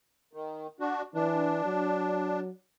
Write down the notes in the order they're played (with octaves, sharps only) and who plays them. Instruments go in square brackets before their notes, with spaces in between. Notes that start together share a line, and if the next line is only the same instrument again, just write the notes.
[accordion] D#3
D4 F#4
[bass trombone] E3 [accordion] D4
[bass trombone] F#3